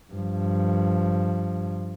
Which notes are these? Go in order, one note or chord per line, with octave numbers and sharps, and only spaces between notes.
G2 F3